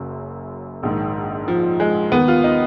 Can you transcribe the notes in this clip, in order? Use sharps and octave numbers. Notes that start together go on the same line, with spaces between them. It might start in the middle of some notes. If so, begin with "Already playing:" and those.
Already playing: F#1 F#2 C#3
A#1 G#2 D#3
F3
G#3
D#2 D#3 B3
F4
D#4